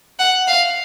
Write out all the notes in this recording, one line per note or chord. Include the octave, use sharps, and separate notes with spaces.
F#5
F5